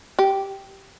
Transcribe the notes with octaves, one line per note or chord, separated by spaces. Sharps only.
G4